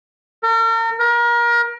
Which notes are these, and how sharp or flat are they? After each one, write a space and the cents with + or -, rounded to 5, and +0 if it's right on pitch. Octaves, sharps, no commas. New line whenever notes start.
A#4 -40
A#4 +30